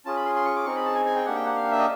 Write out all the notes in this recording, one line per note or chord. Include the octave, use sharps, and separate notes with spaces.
C#4 F4 G#4 A5
B5
C6
C6
C#6
D6
C4 D#4 G#4 C#6
B5
A5
G#5
G#5
G5
A#3 D4 G4 F#5
G5
F#5
F5
E5
D#5